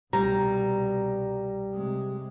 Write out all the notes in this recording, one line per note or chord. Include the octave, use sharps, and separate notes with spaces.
C2 B2 G3 A#5
C3 G#3